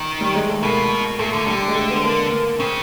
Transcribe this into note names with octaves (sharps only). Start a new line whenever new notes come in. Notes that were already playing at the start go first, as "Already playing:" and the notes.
Already playing: D#3
G3
G#3
A3
B2 A#3
A#2 A3
D3
D3 G3
G#3
A3
B3
A#3
A#3
C#3 C4